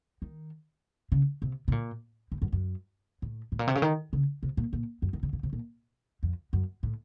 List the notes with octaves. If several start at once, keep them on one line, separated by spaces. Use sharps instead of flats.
D#3
C#3
C3
C3
A#2
A2
F#2
F#2
A2
A2
A#2
C3
C#3
D#3
C#3
C3
A#2
A#2
F#2
D#3
C#3
C#3
C3
A#2
F2
F#2
A2